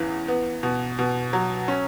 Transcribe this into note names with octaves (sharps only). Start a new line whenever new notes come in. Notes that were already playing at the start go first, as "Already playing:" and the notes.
Already playing: E2 C#3 E3
B3
B2
B2
F#3
C#4